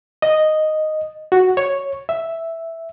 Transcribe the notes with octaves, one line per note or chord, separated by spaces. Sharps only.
D#5
F#4
C#5
E5